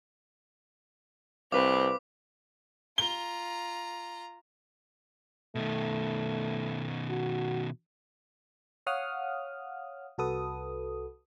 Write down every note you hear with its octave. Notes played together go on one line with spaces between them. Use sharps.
C2 C4 B4 F5 D6
F4 A#5 G7
B2 D#3 A3
F#4
C#5 F5 F#5 D#6 F6
C2 F#4 A4 B4 D#6